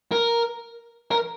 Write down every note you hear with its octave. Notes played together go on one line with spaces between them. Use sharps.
A#4
A#4